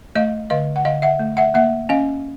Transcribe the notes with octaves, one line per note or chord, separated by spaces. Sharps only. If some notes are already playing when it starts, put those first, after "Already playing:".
A3 D#5 F5
D3 D#5 F5
F#5
D3 D#5 F5
E5 F#5
A3
E5 F#5
A#3 E5 F#5
C#4 D#5 F5